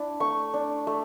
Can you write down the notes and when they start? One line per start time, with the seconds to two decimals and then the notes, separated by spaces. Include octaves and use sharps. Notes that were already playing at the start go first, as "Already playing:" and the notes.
Already playing: D4 E4
0.20 A3 C#6
0.54 D4
0.87 A3